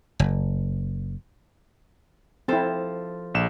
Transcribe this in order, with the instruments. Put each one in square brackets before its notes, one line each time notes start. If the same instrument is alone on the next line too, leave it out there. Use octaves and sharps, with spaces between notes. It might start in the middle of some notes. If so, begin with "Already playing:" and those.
[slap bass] F#1
[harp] F3 A4 C5 [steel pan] C4 E4
[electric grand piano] A#1 E7